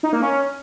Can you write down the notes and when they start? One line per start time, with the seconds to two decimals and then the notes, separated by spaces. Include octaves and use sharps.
0.03 D#4
0.13 A#3
0.22 C#4